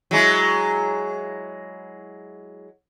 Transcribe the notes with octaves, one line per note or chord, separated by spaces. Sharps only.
F#3 G#3 E4